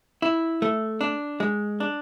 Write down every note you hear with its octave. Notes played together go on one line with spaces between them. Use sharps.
E4
A3
D4
G#3
D4